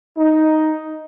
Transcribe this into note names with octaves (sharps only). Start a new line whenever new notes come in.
D#4